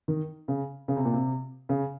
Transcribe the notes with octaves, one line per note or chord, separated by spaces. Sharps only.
D#3
C#3
C#3
C3
A#2
C3
C#3